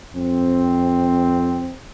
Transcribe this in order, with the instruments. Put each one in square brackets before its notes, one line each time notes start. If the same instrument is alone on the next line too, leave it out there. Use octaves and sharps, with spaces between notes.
[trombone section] F2 C4